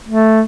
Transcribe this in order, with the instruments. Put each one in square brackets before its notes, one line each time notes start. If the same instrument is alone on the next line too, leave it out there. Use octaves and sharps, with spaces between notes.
[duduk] A3